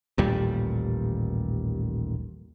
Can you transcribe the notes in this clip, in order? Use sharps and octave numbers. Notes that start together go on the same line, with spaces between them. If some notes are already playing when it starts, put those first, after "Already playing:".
A1 D#2 A#2 G3